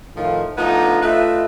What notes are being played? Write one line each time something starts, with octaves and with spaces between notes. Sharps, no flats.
A2 D#3 F3
F3 A3 B3 D4 D#4
A3 F4 B4 D#5 E5